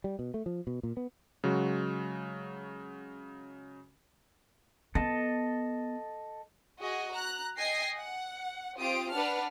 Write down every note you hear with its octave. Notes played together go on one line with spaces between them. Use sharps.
G3
B2
A3
F3
B2
A#2
B3
C#3 F#3 G#3 F#4
B3 A4 D#5 A5
F#4 G#4 D#5
A#5 F#6
D#5 G5 G#5 A#6 C7
F#5
C4 F4 G4 D#6 D7
D4 B4 D5 F#5 A5 F6